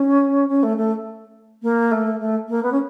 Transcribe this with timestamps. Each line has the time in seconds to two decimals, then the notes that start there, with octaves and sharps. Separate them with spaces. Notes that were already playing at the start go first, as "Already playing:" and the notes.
Already playing: C#4
0.48 C#4
0.62 A3
0.76 A3
1.62 A#3
1.91 A3
2.19 A3
2.48 A#3
2.62 B3
2.71 C#4